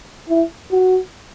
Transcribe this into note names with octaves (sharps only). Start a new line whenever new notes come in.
E4
F#4